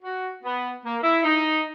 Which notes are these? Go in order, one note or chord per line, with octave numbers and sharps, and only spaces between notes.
F#4
B3
A#3
E4
D#4